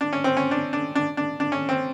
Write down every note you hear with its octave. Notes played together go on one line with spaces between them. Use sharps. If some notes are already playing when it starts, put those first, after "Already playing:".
D4
C#4
C4
C#4
D4
D4
D4
D4
D4
C#4
C4